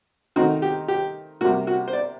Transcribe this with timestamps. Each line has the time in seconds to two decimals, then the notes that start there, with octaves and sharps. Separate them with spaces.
0.36 D#3 A3 C4 D#4 F#4
0.62 G4
0.88 G4
1.41 C3 G3 A#3 F#4
1.67 F#4
1.88 C5
1.93 D5